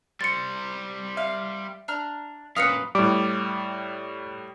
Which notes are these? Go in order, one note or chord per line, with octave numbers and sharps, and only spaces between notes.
G3 C5 A6 C#7
E5 F5
D4 A#5 F6
F#2 A#2 B4 C#5 F5 D#6 C#7
A2 G3 D6